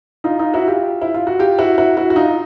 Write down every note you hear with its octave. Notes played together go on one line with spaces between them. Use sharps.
D#4 F4
D#4 F4
E4 F#4
F4 G4
E4
F4
F#4
F4 G4
E4 F#4
E4 F#4
E4 F#4
F#4
D#4 F4